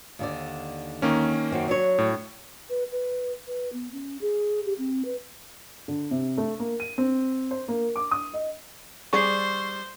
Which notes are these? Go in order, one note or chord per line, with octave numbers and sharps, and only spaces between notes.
D#2 D3 D5
D#3 A#3 C#4
F#2 C4 F#4
F#3 D4 C#5
A2
B4
B4
B4
B3
C#4
G#4
G4
C4
B4
D3
C3
A3
A#3
D#7
C4
C5
A#3
D6
D#6
D#5
G3 G#4 C5 D5 C#6 C7